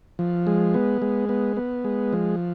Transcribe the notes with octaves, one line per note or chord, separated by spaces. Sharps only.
F3
G#3
B3
G#3
B3
B3
G#3
F3